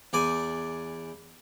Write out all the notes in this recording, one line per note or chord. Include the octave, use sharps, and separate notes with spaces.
E2 D5 G#5